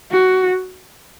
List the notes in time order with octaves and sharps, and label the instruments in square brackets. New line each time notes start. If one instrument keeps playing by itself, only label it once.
[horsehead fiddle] F#4